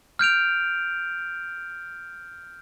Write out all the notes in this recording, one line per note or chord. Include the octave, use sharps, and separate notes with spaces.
F6 G6 D7 F7